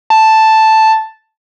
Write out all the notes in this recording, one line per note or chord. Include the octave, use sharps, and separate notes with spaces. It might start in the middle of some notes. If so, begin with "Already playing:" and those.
A5